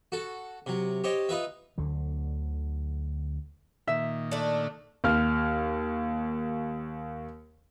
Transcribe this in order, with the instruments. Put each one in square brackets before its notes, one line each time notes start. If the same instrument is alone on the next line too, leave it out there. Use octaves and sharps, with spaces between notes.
[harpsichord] F#4 A4
C3 F#3
G4 C5 C#5 D#5
D#4 F4 B4 E5
[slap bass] D2 D3 F#3
[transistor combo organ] A#2 D#3 [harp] E5
[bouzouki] A3 D4
[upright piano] D#2 F6